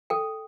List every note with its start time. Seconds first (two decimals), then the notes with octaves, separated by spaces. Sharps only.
0.10 A4 G5